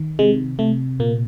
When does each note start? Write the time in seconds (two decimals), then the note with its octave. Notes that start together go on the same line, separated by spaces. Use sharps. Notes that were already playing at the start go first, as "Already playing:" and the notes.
Already playing: D#3
0.19 C3 G#3
0.59 C3 A3
1.00 A#2 A#3